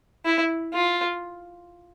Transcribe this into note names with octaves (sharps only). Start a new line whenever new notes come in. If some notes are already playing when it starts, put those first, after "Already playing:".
E4
F4